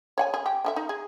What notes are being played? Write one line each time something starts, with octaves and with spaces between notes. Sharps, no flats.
C#5 F#5 G#5
G#4
G4
D3 G4 E5
D#4
G#4